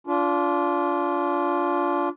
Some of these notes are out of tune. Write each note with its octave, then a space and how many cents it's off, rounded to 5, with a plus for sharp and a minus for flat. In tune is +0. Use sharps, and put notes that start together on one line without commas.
D4 -30 F4 +0